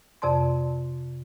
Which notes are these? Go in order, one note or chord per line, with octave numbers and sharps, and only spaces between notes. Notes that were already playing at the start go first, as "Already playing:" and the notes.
F2 C3 D5 A5 C6